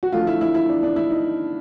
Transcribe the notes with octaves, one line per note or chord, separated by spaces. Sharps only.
F#4
D3 F3 A3 F4
E4
E4
E4
D4
D4
E4
D#4